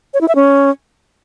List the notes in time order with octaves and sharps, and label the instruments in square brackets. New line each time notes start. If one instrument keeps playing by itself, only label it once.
[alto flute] C#5
E4
E5
C#4